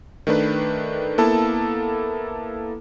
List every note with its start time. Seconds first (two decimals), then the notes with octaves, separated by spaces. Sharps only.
0.27 D#3 A3 D4 B4
1.18 A#3 B3 E4 A4 A5